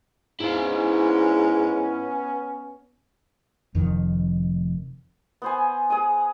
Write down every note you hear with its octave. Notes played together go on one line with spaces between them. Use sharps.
G#2 B3 C#4 E4 F5
F1 F2 D#3
B3 C5 G#5
G#4 G#5 D#6